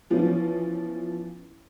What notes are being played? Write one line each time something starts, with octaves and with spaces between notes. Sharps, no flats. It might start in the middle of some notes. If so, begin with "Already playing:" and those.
E3 F3 B3 C#4